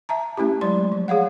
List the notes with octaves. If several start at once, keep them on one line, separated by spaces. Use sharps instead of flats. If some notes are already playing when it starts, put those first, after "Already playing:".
E5 A5 A#5
A3 C#4 E4 G4
F#3 G#3 D5 C6
F3
G#4 C#5 F5 F#5